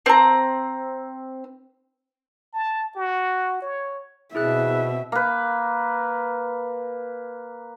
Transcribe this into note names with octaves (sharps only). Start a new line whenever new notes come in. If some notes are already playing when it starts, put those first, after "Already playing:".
C4 A#5
A5
F#4
C#5
B2 C4 E4 G#4 E5 F#6
A#3 B4